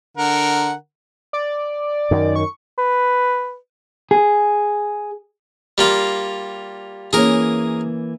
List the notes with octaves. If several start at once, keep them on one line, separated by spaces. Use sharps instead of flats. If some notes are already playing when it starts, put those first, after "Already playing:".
D3 A#4 F#5
D5
F#2 D#3
C#6
B4
G#4
G3 A#3 F4
E3 A#3 C#4 G#4 A#4